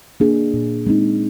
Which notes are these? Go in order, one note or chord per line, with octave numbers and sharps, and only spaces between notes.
A#3 D4 G#4
A#2
G#3 C4 D#4